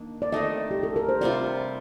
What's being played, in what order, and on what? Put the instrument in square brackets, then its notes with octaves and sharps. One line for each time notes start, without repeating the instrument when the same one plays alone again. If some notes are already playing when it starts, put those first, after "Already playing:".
Already playing: [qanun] D#3 A#3 D4
[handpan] D5
[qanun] D#3 A3 C4 [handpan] D#5
[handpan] G4
A4
A#4
C5
[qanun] C3 G3 C4 F4 [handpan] D5